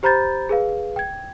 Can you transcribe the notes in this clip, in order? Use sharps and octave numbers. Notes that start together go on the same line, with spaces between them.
G4 C5 A#5 B5 G6 A6
G#4 B4 F5
G5 G#6